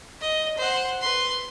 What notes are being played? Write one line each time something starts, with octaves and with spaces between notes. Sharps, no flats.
D#5
C5 F#5
B4 C6